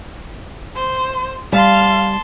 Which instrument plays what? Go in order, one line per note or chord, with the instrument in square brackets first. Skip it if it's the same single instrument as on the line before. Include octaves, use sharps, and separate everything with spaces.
[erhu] C5
[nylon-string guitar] G3 [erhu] F5 [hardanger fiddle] A5 C6